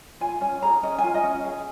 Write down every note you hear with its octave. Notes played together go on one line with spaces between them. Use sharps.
F4 G#5
C#4 G#5
G#4 A#5
C#4 D#5
G#5
F4
D#5
C#4
G#4